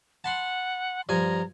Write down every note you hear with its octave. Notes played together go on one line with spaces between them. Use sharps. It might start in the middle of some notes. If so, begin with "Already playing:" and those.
F#5 A5 B5 C6
G2 F3 G#5 A#5